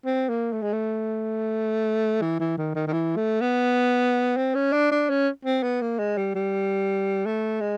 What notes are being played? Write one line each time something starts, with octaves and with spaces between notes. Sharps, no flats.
C4
A#3
A3
G#3
A3
E3
E3
D#3
D#3
D#3
E3
A3
B3
C4
C#4
D4
D4
C#4
C4
B3
A#3
G#3
G3
G3
A3
G#3